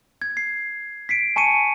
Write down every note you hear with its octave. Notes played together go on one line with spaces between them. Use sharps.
G#6
C7
B6 C7 D7
G#5 A5 C#6 C#7 D#7